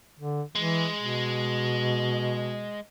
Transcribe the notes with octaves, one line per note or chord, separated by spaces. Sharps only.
D3
E3 G#3
B2